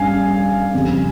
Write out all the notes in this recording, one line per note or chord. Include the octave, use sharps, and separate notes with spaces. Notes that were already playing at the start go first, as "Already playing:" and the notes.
Already playing: G2 G3 C#4 F5 G#5
F2 C#3 G3